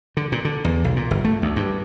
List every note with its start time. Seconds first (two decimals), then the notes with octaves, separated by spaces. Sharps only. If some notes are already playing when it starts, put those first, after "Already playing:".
0.17 D3
0.32 A#2
0.45 D3
0.64 E2
0.84 B1
0.96 A#2
1.11 G1
1.24 A3
1.42 D2
1.56 G2